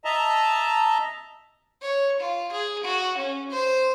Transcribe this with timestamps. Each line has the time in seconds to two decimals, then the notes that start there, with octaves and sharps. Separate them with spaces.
0.05 D#5 E5 A5 A#5
1.82 C#5
2.20 F4
2.52 G#4
2.84 F#4
3.18 C#4
3.51 C5